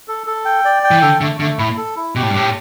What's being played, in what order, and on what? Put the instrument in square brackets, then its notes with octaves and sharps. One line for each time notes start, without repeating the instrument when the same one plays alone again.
[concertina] A4
A4
G5
D5
G5
[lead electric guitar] E3
[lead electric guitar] D3 [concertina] A4
[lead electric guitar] D3 [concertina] A3
[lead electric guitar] D3 [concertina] A3
[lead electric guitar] A2 [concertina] E4
[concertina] A4
E4
[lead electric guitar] B2 [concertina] G4
[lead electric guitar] A2
G2
[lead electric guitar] A2 [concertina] G4